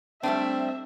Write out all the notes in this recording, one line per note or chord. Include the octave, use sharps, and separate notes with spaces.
G3 A3 C4 D4 E5